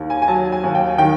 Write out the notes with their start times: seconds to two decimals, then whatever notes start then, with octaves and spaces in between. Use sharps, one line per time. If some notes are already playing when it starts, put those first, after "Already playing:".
Already playing: D#2 D#3
0.10 G#5
0.22 G#5
0.28 F#3 A5
0.52 G#5
0.64 D#2
0.75 G5
0.98 D#3 G5